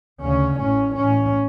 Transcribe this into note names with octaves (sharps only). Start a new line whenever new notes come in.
D2 C#3 C#4
A1 A2 C#4
A1 A2 C#4